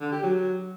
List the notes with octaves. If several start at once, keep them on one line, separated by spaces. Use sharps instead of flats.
D3
G4
F#3